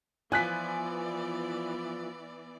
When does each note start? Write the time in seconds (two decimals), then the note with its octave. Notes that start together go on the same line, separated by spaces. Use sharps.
0.32 E3 F3 B3 F4 D5 G#5 F#6 B6